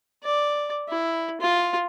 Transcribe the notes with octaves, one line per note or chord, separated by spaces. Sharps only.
D5
E4
F4